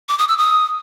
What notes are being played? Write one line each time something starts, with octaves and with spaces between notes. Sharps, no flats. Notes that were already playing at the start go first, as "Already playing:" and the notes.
D6
D#6
E6
D#6